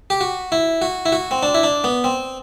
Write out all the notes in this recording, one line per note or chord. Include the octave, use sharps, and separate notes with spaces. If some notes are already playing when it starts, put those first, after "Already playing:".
G4
F#4
E4
F#4
E4
F#4
C4
D4
E4
D4
B3
C4